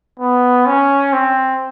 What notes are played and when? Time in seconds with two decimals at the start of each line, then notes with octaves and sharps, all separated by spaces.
0.20 B3
0.66 C#4
1.13 C4